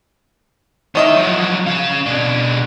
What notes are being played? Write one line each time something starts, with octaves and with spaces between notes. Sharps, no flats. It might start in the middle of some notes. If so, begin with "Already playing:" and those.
D#3 C#5 D#5 E5
F3 F#3
C#4 F5
B2 D4